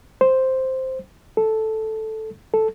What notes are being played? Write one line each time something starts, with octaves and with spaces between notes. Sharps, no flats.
C5
A4
A4